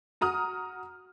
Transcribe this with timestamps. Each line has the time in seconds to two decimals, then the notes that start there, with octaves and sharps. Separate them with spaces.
0.21 F#4 A#5 D#6 F6